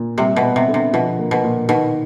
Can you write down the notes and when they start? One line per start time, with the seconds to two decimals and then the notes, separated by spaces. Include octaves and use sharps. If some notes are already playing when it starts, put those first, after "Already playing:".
Already playing: A#2
0.18 C3 G3
0.36 B2
0.43 B3
0.56 C3
0.68 D3
0.74 C3
0.93 B2 F3
1.19 A#3
1.31 B2
1.44 A#2
1.68 B2 D#3